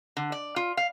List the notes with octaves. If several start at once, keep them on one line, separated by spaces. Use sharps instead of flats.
D3
D5
F4
F5